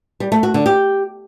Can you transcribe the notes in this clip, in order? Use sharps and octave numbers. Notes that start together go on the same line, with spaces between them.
G3
A3
F#4
D3
G4